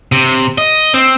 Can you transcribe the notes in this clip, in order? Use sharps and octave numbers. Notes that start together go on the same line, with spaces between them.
C3
D#5
C4